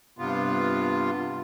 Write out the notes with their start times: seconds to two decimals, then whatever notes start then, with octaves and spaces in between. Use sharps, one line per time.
0.18 G2 C3 B3 F4